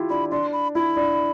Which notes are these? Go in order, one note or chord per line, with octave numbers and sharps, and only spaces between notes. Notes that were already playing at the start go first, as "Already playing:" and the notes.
Already playing: E4 F4 G4
D4 B5
D4 C6
B5
E4 B5
D4